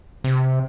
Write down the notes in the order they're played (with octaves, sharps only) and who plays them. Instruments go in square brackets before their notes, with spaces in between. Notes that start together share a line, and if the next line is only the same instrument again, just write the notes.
[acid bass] C3